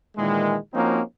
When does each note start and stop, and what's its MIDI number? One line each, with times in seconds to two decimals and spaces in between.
0.17 0.57 46
0.17 0.57 51
0.17 0.57 52
0.17 0.57 56
0.74 1.01 53
0.74 1.01 58
0.74 1.01 60
0.74 1.01 61
0.74 1.01 63
0.74 1.01 66